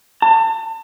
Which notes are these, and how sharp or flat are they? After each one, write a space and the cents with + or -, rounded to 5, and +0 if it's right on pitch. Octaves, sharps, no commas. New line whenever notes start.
A5 +35